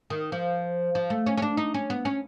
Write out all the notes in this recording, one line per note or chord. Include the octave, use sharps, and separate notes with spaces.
D#3
F3
F3
A3
C#4
C#4
D4
D#4
C#4
B3
C#4